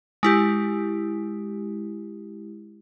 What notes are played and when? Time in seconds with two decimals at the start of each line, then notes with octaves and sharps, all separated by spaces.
0.23 G#3 E4 G4